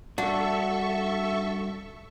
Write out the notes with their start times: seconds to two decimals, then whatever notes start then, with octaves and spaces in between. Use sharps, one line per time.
0.18 G2 D4 F#4 A4 E5 C#6